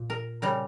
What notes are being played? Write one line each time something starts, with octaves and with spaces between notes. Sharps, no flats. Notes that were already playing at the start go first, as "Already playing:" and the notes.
Already playing: A#2
A#4
C#3 G3 A#4